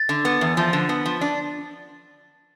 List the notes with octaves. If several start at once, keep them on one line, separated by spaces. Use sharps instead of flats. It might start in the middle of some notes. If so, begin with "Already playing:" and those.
Already playing: A6
D3
B3
E2
F3
D3
B3
F3
D4